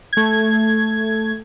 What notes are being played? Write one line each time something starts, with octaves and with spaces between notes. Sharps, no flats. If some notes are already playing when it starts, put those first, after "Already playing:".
A3 G#6